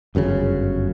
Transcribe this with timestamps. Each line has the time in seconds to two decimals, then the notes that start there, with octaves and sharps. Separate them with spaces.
0.15 G1 F#2 A2 C#3